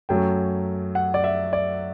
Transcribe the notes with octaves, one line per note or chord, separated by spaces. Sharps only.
F#2 F#3 A3 G5
F#5
D5
E5
D5